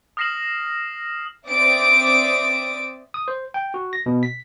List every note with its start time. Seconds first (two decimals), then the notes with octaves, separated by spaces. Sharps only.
0.17 D#6 F6 A#6 C7 E7 F#7
1.48 C4 D5 E5 D6 D#6 D7
3.14 D#6
3.28 C5
3.54 G5
3.74 F#4
3.93 A#6
4.06 B2
4.23 B6